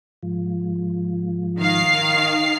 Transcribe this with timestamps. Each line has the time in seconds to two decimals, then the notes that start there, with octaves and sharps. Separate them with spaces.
0.23 G#2 F3
1.59 D#3 F5 C7